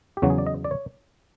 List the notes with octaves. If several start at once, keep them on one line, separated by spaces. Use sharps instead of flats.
G4
E2 C#3 F#3 F#4
G#4
D5
D#5
D5
C#5